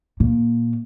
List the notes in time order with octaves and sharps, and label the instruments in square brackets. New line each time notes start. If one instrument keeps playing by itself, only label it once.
[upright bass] A#2